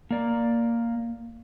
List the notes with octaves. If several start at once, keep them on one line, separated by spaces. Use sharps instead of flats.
A#3 D5